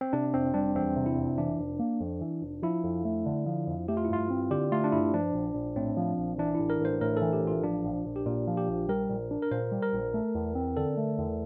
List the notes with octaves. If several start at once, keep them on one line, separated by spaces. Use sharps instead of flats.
C4
C3 D4
F1 C4
G3 D4
E2 C4
C3
E4
F1
E3 D4
F1
A#3
F2
E3
F1
F3 E4
F2
A3
D3
F3
F2
A3 G4
F4
E4
G2 F4
C4
D3 G4
A3 F4
D4
G2 E4
F3 D4
A#1
A#1
A2 C4
F3
A#1
E3 D4
A1 E4
A#4
A1 C5
A2 A#4
E3 A4
G4
A1 F4
F3 D4
A#1
A#1
G4
A#2 F4
F3
G4
A#1
G3 A#4
A#1
D4
A#4
A#2 C5
G3
A#4
A#1
A3
E2
C4
D3 A4
A3
E2